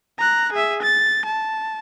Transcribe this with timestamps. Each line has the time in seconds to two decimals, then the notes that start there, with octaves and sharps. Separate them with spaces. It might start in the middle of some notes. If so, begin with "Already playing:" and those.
0.18 A#5 F#6
0.53 G#4 E5
0.82 A6
1.25 A5